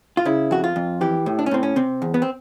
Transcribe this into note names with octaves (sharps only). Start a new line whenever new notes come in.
F4
C#3 E4
F2 F#4
F4
F2
E3 G4
A2
D4
C#4
A2 C4
C#4
C3 C4
E2
B3
C4